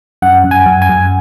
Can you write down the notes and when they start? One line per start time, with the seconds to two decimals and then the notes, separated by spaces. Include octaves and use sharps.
0.22 F#2 F#5
0.44 F#2
0.51 G#5
0.66 F#2
0.82 G#5
0.89 F#2